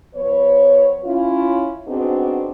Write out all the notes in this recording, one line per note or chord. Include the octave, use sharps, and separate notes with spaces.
F3 B3 B4 C#5
C#4 E4 F4
B3 C4 D4 D#4 F#4 G#4